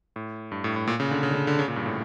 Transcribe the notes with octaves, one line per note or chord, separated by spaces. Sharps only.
A2
G2
A2
A2
A#2
C#3
D3
C#3
D3
C#3
D3
C#3
A#2
G2
A2